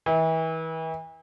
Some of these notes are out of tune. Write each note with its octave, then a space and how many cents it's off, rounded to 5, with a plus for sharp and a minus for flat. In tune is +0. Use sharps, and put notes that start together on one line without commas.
E3 -35